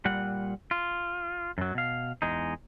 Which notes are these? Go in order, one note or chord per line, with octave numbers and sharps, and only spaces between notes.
A#2 G3 F#5
F4
F#2 F#3
B2 F5
E2 G#3 D#4